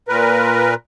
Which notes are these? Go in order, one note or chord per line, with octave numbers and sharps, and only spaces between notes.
A#2 A#4 B4